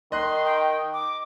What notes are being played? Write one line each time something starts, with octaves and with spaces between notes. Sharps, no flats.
D#3 D#5 C6 F#6
G5
D6